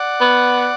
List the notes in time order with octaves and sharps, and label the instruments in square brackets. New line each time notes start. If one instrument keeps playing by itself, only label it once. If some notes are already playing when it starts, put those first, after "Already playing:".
Already playing: [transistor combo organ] D5 F#5
[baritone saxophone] B3